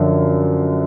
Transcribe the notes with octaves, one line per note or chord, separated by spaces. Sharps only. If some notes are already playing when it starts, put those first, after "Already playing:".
Already playing: F#2 D3 F3